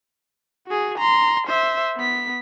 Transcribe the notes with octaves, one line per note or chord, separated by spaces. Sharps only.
F#4 G#4
A#5 C6
C5 E5
B3 B6